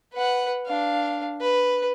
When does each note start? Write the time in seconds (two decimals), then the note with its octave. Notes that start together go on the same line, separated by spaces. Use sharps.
0.14 B4 F#5
0.66 D4 F5
1.41 B4